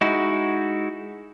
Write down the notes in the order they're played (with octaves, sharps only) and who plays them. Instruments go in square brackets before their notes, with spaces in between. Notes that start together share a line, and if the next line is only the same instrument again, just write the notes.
[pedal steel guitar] G#3 D#4 E4 F#4